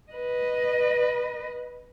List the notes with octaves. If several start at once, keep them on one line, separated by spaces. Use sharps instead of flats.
B4 D#5